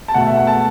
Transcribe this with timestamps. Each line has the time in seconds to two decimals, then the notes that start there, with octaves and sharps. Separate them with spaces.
0.08 A5
0.14 B2 A3 F#5
0.26 E5
0.37 F#5
0.47 A5